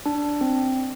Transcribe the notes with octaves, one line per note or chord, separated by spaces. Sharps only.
D4
C4